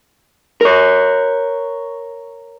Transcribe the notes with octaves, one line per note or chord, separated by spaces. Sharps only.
A#4 C#5